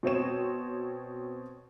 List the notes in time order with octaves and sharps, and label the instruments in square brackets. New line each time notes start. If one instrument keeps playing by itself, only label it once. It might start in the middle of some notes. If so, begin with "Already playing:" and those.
[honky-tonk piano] B2 C4 C#5 E7